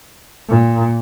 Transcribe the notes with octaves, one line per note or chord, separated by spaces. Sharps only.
A#2